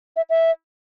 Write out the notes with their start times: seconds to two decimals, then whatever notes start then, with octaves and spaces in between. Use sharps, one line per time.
0.17 E5
0.30 E5